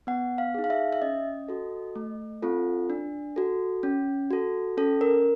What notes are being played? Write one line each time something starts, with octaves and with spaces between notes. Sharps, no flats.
B3 F#5
F5
D#4 G#4
F5
E5
E5
C#4 D#5
F#4 A4
A3
C4 F4 A4
D4
F#4 A4
C#4
F#4 A4
C#4 A4
A#4